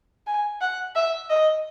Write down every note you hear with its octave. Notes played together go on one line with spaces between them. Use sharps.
G#5
F#5
E5
D#5